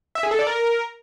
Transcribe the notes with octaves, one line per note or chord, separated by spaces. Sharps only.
E5
G#4
A4
D5
A#4